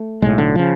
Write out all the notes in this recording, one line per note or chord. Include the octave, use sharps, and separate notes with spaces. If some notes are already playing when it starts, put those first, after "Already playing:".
Already playing: A3
B1 A2 G#3
D3
C#3 F3